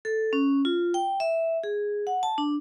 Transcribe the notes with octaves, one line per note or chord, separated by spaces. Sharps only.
A4
C#4
F4
G5
E5
G#4
F#5
A5
D4